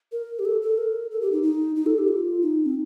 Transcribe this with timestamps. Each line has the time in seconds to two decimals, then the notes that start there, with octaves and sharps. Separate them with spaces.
0.12 A#4
0.39 G4
0.45 A4
0.62 A4
0.78 A#4
1.11 A4
1.22 G4
1.32 D#4
1.43 D#4
1.76 D#4
1.86 A4
1.98 G4
2.08 F4
2.42 D#4
2.66 C4